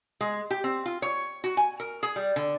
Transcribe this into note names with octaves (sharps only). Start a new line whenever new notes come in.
G#3
G4
C4
F4
C#5
F#4
G#5
A#4
G#4
G3
D3